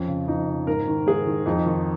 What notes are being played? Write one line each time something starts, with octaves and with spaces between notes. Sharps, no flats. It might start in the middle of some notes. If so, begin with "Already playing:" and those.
Already playing: F2 C#4
C#3
F2 D#4
C#3
G#2 A#4
D#3
G#2 G#4
D#3
F2 D#4
D#3